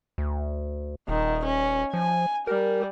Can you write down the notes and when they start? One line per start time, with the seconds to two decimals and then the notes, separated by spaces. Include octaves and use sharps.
0.18 D2
1.08 D#1 D#3
1.45 C#4
1.94 F3 G#5
2.47 G3 A#4